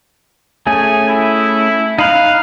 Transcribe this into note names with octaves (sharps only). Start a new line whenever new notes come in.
A3 C#4 G#4 G#5
E4
D#4 F5 B5 F#6